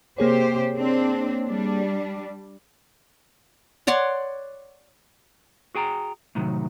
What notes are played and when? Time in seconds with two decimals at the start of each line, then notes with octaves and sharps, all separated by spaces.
0.18 C3 A#3 G4 G#4 C5 C#5
0.76 C4 D4
1.44 G3 D4
3.87 C#5 D5 F#5 C6
5.75 F#4 G#4 G5 A5 A#5
6.35 A2 C3 D#3 F#3